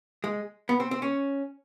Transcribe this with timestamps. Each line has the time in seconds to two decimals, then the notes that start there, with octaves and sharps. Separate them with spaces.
0.24 G#3
0.69 B3
0.80 C4
0.91 C4
1.02 C#4